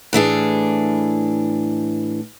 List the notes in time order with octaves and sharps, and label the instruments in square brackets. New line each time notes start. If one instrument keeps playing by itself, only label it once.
[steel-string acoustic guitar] A2 E3 D4 G#4